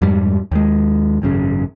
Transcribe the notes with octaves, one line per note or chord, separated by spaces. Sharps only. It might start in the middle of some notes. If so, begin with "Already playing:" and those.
F2 G#2 G3
D#2 G#3
G#1 F#2 C#3